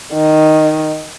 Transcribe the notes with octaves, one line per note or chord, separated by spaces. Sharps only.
D#3